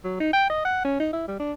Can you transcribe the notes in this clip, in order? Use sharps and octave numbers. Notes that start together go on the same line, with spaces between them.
F#3
D#4
G5
D#5
F#5
C#4
D#4
E4
G3
D4